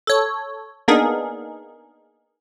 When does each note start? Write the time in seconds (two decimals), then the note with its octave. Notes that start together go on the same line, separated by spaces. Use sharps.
0.07 A4 C#5
0.88 A#3 B3 D4 D#4 G#4 A#4